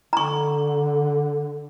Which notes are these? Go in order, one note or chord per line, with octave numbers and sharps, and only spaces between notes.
D3 A#5 C#6